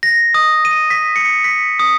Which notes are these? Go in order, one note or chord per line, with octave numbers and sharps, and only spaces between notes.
A#6
D#6
D#7
B6
C#7
B6
D#6